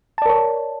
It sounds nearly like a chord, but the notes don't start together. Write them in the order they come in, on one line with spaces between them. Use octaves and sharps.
A5 D5 A#4 C#5